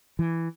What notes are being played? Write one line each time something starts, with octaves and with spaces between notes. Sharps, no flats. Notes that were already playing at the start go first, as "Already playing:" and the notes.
E3